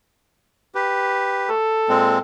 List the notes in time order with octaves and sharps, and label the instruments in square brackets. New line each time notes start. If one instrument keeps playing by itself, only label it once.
[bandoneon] G4 B4
[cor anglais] A4
[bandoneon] A#2 G#3 C4